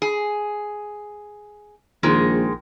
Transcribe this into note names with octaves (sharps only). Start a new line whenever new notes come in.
G#4
A#1 D#3 G#3